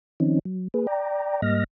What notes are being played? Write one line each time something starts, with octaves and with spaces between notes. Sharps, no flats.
D#3 F3 C4 C#4 D#4
F#3
A#3 G#4 B4
D5 G5 A#5
G#2 G3 A#3 D#5 F6 A#6